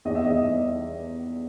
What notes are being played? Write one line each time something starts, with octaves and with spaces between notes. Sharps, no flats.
E2 D#5
E5
E2 D#5
E2